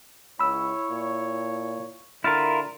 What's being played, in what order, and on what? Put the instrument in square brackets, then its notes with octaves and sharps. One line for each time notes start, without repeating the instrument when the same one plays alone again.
[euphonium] C#2 [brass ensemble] E4 C#5 [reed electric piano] B5 E6
[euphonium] A#2
[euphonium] D3 [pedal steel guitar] E4 F4 A#4 [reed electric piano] F6 A6